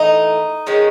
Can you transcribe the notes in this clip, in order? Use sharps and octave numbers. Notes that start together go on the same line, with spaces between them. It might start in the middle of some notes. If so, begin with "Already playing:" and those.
Already playing: A2 E3 A3 D#4
D#3 G#3 C#4